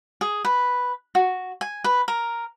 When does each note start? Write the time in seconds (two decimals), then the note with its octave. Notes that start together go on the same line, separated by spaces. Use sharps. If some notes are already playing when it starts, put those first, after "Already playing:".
0.21 G#4
0.45 B4
1.15 F#4
1.61 G#5
1.84 B4
2.08 A#4